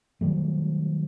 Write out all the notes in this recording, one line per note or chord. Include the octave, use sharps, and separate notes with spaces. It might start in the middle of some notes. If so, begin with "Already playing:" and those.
D#3 F#3 G3 A3